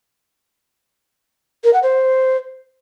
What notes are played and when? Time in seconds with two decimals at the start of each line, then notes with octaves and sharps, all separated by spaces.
1.64 A#4
1.73 F#5
1.83 C5